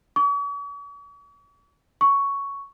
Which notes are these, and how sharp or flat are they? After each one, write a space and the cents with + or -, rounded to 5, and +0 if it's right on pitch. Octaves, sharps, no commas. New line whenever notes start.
C#6 +45
C#6 +5